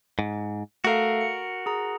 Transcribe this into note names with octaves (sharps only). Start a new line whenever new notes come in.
G#2
A3 F#4 A4 A#4 F5
C#7
G#4 A#5